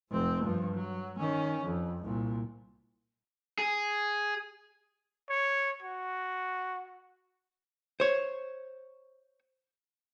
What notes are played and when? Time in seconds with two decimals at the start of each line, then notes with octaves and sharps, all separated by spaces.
0.11 F1 C4
0.44 G2 F3
0.75 F#3
1.18 D#3 C#4
1.65 F2
2.04 C2 A#2
3.58 G#4
5.30 C#5
5.83 F#4
8.00 C5 C#5